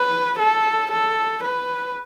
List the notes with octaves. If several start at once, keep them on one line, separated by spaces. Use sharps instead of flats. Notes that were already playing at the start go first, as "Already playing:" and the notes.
Already playing: B4
A4
A4
B4